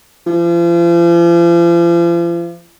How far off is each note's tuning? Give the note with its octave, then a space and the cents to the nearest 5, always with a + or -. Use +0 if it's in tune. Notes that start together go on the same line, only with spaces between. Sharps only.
F3 -40